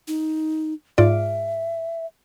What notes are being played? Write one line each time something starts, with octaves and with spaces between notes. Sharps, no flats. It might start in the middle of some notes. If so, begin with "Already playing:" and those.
D#4
G#2 F4 D5 E5